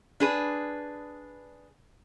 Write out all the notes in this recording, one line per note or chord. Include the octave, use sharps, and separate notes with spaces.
D4 G#4 B4